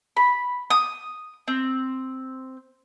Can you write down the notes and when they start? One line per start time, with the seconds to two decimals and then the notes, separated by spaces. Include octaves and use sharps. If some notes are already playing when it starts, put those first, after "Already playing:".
0.17 B5
0.70 D#6
1.48 C4